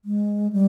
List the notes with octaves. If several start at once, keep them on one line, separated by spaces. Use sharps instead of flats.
G#3
G3